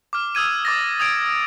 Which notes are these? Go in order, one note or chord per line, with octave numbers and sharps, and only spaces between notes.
D6 F6
D#6 E6 G#6 D#7
D6 A6 A#6
D#6 G#6 D7